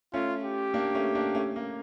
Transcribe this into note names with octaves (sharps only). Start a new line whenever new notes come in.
A3 C#4 F4
G4
A#3 D4
A3 C#4
A#3 D4
A3 C#4
A#3